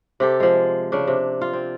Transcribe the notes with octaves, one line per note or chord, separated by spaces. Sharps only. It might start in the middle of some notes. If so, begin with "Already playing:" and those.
C3 G4 A4
F3 G#3
C#3 D4
C3
F4
C4